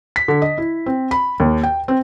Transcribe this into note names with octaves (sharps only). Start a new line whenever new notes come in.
B6
D3
D#5
E4
C4
B5
D#2
G5
C4